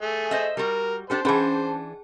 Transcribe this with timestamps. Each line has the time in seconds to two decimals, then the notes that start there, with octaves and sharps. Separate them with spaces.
0.01 A3 G#4
0.31 C5 D#5 E5
0.57 G3 F#4 A#4
1.10 D4 G4 A4 C5
1.25 E3 C#4 D4 G#4 A5